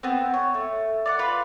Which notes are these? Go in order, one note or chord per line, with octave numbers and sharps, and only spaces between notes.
B3 C4
C#5
A3
D5 F5 F#5
F4 B4 B5